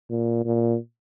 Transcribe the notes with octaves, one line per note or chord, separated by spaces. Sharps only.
A#2
A#2